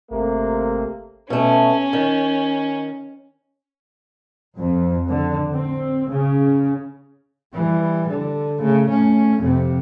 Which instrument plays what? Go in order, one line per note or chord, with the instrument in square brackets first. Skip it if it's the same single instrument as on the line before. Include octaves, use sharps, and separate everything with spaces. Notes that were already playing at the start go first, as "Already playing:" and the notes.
[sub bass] G#1 [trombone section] C3 A3 A#3
[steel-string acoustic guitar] B2 A3 [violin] C#4
[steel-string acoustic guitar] D#3
[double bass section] F2
D3
C4
C#3
[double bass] E3 G3
D3
C#3 A3
A3 C#4
F2 C3